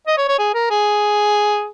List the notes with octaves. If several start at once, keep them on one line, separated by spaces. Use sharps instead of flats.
D#5
C#5
C#5
G#4
A#4
G#4